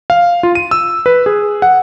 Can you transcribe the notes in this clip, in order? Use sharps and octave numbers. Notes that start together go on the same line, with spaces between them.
F5
F4
D#7
E6
B4
G#4
F#5